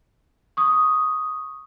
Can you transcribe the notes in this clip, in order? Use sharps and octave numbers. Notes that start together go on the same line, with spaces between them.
C#6 D#6